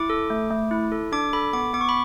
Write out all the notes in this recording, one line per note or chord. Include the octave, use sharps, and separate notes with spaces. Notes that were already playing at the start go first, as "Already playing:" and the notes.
Already playing: E4 D6
A4
A3
A3
E4
A4
D4 D6
A4 B5
B3 D6
B3 D6
C#6
B5